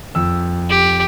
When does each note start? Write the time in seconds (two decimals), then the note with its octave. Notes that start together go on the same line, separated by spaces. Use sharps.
0.15 F2 E6
0.70 G4